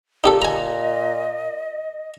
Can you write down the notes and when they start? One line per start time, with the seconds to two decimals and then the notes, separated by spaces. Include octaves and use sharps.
0.24 A#2 D#4 G4 A4
0.42 D#5 G#5 A#5